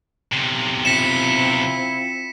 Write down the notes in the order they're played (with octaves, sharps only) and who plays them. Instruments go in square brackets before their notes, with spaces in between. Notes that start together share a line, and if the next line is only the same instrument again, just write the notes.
[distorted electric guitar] B1 C3
[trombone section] C4 E4 F4 [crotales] B6 C#7 E7